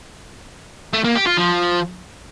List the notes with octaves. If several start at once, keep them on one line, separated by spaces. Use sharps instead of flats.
A3
A#3
G4
F4
F3